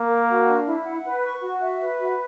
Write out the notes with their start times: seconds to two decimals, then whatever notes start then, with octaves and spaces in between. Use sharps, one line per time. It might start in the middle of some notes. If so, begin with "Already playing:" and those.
Already playing: A#3
0.09 A#4
0.29 F#4
0.47 D4
0.66 E4
0.85 F#5
1.05 B4
1.23 C#6
1.42 F#4
1.62 E5
1.81 B4
2.00 F#4